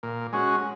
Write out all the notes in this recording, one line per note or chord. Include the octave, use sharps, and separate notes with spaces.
A#2
G#3 C#4 F#4